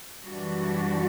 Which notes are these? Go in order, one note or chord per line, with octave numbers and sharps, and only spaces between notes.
F#2 E3 G3 D4 F#4